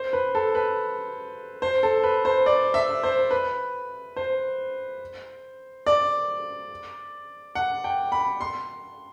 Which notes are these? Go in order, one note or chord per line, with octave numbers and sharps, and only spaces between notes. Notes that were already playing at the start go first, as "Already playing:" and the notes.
Already playing: C5
B4
A4
B4
C5
A4
B4
C5
D5
E5
C5
B4
C5
D5
F#5
G5
B5
C6